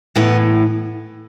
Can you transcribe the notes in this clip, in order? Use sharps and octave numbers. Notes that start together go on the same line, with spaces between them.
A2 E3 B3